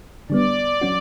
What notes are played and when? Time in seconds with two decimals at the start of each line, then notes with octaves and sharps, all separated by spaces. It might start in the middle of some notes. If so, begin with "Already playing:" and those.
0.30 D3 G3 B3 D5
0.81 F#3 C#4 F#4